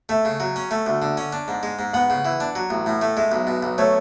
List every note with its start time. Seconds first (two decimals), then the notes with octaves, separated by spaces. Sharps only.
0.09 A3 E5
0.25 C#3
0.40 F#3
0.56 C#4
0.71 A3
0.86 D2
1.02 D3
1.17 C#4
1.33 D4
1.48 G#2
1.63 G#3
1.79 G#2
1.93 B3 F#5
2.10 C#3
2.25 E3
2.40 D4
2.55 F#3
2.70 A1
2.86 A2
3.02 A3
3.17 G#3 E5
3.32 B1
3.47 B2
3.63 B1
3.78 A3 C#5